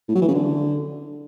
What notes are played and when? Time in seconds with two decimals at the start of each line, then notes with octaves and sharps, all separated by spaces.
0.09 A2
0.15 F#3
0.21 E3
0.28 C#3
0.34 D3